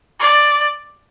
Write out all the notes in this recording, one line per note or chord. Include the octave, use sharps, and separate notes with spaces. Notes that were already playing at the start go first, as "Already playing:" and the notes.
D5